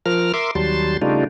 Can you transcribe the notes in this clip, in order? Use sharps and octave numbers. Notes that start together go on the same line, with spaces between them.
F3 A#4 F6
A#4 E5 C6 D6
D#2 F#3 G3 A5 C6
C#3 G3 A3 D4 D#4 F4